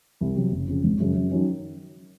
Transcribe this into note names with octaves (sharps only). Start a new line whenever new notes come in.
C2
C3 F#3
F#1
F2 C#3
G#1
F#2 C#3
F#2
D#3 F#3 C#4